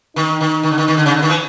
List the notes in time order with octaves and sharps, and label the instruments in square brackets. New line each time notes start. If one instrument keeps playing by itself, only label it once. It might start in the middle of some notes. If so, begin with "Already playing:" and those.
[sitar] D#3 [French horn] D#4
[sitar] D#3
D#3
D3
D#3
D#3
D3
C#3
D3
D#3
E3